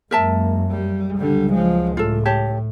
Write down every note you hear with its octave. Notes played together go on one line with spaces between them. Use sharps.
F#2 G#3 A#3 A#4 E5 A5
G3
C#2 D3 F#3 G3
F3 G#3
A2 F4 A4
G4 C#5 A5